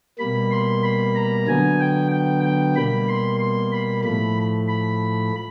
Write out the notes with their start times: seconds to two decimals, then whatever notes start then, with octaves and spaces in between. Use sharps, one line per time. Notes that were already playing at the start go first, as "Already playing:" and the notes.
0.19 B2 G3 A#3 B5
0.51 C6
0.83 B5
1.16 A#5
1.47 D3 F#3 B3 G#5
1.80 G5
2.11 G5
2.44 G5
2.76 B2 G3 A#3 B5
3.08 C6
3.40 C6
3.72 B5
4.04 A2 F3 A3 B5
4.68 B5